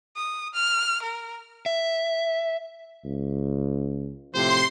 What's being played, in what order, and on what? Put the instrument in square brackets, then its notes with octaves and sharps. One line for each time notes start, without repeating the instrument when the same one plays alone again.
[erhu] D#6
F6
A#4
[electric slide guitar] E5
[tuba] C#2
[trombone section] A2 C3 F3 [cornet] C5 [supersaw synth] C6